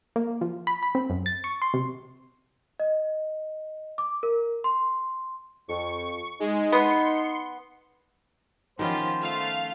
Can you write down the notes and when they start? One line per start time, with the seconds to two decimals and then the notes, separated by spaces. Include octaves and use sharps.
0.16 A#3
0.41 F3
0.67 B5
0.83 B5
0.95 C4
1.10 F#2
1.26 A6
1.44 C#6
1.62 C6
1.74 C3
2.80 D#5
3.98 D6
4.23 A#4
4.64 C6
5.69 F2 C#6
6.40 G#3 D#4
6.72 B3 C6 C#7
8.79 D#3 F3 B3 C#4 F4 G4 C5
9.21 A3 F4 F5